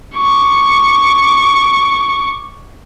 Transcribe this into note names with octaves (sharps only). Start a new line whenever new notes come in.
C#6 D6